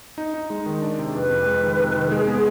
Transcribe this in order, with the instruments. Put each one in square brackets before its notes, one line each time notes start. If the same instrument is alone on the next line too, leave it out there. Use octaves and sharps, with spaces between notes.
[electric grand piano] D#4
D#4
G#3
D#3
D4
C3
[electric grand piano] F2 [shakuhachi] B4
[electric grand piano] F2
G#3
D#3
C3
D#3
[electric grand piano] G#3 [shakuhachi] G#4
[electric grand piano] B3